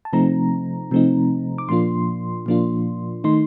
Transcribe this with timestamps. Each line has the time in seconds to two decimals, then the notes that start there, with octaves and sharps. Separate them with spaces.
0.05 A5
0.13 C3 F3 A3 C4 D#4 A#5
0.91 C3 F3 A3 C4 D#4
1.58 D6
1.69 A#2 F3 A#3 D4 F4 C6
2.46 A#2 F3 A#3 D4 F4
3.24 D#3 A3 D#4 C6